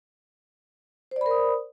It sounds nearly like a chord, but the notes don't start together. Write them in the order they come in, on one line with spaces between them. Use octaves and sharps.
C5 D5 B5 A#4 D#6